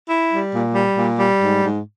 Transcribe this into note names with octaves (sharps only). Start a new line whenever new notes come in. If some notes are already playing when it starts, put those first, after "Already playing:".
E4
G3
A#2
G3
A#2
G3
G#2
G#2